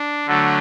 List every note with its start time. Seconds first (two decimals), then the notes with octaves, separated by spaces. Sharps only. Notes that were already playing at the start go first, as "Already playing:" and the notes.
Already playing: D4
0.26 D3 F#3 A3